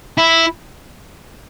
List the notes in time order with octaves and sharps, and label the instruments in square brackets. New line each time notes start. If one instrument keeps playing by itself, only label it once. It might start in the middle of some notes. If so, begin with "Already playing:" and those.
[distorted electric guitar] E4